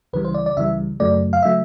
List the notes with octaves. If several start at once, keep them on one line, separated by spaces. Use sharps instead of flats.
C#2 C#3 E3 G3 B4
C5
D5
D5
C#2 C#3 E3 G3 E5
F#2 C#3 F#3 A3 D5
F5
C#3 F#3 A3 E5